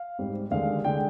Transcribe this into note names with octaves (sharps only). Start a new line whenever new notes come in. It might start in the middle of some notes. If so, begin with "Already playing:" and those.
Already playing: F5
G#2 G3 C4
D#2 D3 G#3 F5
D3 G#3 G5